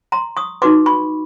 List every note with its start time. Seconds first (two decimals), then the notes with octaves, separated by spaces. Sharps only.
0.12 A#5 C6
0.37 C#6 D#6
0.62 D#4 F#4 B4 C6 D6
0.86 B5 C#6